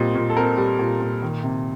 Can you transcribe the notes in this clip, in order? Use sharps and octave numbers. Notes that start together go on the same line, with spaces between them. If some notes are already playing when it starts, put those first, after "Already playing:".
Already playing: A#2 G3 C4 D#5
A#2
A4
C4 A#4
G3
A#2
A#2
D#3
C3